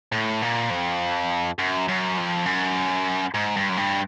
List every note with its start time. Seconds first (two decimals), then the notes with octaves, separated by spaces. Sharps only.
0.12 A2
0.42 A#2
0.70 F2
1.58 F#2
1.88 F#2
2.17 F2
2.46 F#2
3.34 G#2
3.57 G2
3.70 F#2
3.77 G2